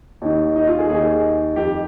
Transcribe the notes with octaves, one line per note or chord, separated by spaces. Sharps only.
D#2 D#3
D#4
F4
G#4
D#2 D#3 G#4
F2 D#3 G4